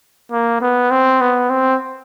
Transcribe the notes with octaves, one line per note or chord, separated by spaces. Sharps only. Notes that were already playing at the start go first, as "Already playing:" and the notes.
A#3
B3
C4
B3
C4